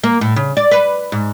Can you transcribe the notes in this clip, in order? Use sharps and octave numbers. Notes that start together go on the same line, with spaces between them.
A#3
A2
C#3
D5
B4
G#2